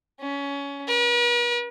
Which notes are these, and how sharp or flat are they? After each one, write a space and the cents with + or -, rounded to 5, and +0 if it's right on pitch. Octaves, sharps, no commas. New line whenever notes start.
C#4 +20
B4 -45